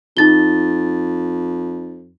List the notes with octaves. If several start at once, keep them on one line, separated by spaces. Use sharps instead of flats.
F2 D#4 A6 G7